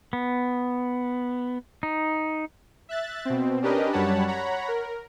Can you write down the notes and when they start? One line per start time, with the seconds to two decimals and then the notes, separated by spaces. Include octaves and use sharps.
0.13 B3
1.83 D#4
2.89 E5 F#6 A6
3.25 B2 C4
3.62 C#4 D4 G4 A#4 B4 D#5
3.92 F#2 G3 C#5 F#5 A5 B5
4.28 C#5 F#5 A#5 B5
4.68 A#4